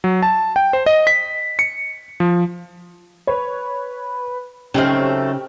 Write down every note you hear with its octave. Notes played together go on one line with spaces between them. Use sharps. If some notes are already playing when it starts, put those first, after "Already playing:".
F#3
A5
G5
C5
D#5
B6
C#7
F3
B4 C#5
C#3 F#3 A3 C4 C#4 D#4 G4 F6